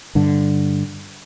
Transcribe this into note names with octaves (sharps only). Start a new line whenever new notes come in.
G2 D3